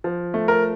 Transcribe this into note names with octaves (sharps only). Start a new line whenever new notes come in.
F3
A3
A#4